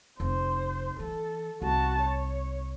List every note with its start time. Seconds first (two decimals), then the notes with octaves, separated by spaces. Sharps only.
0.20 F1 C5
1.00 E3 A4
1.62 C2 F#4 A5
2.01 C#5